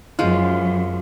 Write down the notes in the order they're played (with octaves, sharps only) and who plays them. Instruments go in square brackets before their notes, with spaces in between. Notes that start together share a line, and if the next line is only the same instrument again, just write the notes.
[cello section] F#2 [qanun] F3 G#3 F4